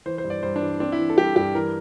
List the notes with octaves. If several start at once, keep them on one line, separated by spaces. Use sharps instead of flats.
E3 C5
C5
G2
D5
G2 C5
D4
E3
C4 D4
E4
E3
A4
G3 G4
G2 G4
E3 A#4